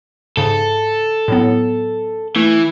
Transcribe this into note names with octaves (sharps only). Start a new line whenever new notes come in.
G#2 C#3 A4
A2 F#3 B3
E3 A3